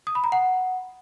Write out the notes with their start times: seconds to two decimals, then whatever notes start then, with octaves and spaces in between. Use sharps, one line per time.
0.07 D#6
0.15 B5
0.24 A#5
0.32 F#5